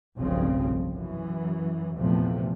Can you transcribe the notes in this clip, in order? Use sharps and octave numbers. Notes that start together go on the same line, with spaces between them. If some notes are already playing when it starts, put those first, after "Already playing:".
F1 B1 G2 C#3 F3 C4
F#2 E3
A#1 E2 C3 F3 A3